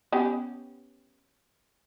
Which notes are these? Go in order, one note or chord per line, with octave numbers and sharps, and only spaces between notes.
B3 C#4 G4